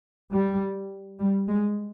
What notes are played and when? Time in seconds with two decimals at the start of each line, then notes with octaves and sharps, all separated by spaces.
0.32 G3
1.19 G3
1.48 G#3